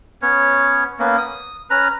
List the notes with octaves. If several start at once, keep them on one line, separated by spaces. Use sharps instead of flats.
B3 C#4 C#5
A#3 B3 C#4
D#6
C#4 B4 A#5